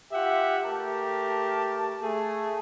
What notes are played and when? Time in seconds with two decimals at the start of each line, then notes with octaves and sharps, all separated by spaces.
0.12 F4 G4 E5 F#5
0.64 A3 G4 A#4 A5
2.01 A3 G#4